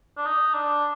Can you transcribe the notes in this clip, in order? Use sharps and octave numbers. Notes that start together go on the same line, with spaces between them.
D4
D#4
D4